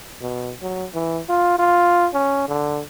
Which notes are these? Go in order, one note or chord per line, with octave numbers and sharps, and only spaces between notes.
B2
F#3
E3
F4
F4
C#4
D3